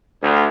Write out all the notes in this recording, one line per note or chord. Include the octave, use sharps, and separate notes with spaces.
D2